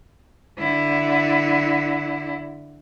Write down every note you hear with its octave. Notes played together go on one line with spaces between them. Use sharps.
D3 E4